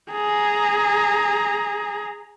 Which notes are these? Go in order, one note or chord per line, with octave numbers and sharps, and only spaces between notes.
G#4 A#5